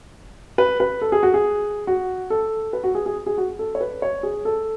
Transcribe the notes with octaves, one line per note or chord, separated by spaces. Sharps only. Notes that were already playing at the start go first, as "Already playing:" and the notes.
B4
B4
A4
G#4
F#4
G#4
F#4
A4
B4
F#4
G#4
G#4
G#4
F#4
A4
C#5
B4
C#5
G#4
A4